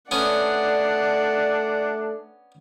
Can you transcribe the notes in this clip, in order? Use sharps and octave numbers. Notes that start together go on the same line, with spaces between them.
A3 B3 C#4 D4 D5 F#5